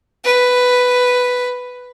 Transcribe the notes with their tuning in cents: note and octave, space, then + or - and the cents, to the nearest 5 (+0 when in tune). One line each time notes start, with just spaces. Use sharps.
B4 +5